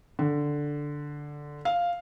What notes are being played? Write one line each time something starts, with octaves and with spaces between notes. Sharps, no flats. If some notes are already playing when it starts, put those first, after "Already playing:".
D3
F5